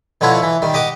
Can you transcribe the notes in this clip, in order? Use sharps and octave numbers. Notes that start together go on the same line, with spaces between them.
B2 D3 F3 E4 C#5
E3
D#3 G3
G4 D#5 F#5 D6